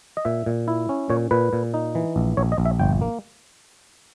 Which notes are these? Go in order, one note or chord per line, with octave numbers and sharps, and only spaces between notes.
D#5
A#2 E5
A#2
E4
C#4
A#2 C#5
A#2 B4
A#2
D#4
E3
A#1
A#1 C#5
D#5
A#1
E5
G1 G5
A#3